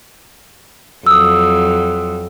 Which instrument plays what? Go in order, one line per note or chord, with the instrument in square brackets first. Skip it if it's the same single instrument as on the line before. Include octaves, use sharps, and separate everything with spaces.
[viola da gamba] F2 F#3 [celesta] D#6 E6